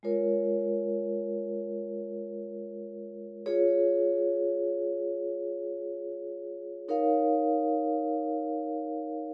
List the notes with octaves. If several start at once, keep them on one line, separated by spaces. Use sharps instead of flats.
G#3 F4 A#4 C#5
F4 G#4 C#5
D#4 A#4 C#5 F5